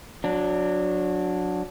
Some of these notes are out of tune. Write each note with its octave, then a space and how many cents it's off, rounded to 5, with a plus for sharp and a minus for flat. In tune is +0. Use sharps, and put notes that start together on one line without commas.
F#3 -20 D4 +0